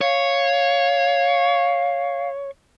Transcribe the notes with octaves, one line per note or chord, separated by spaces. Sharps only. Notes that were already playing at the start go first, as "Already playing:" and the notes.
C#5 F5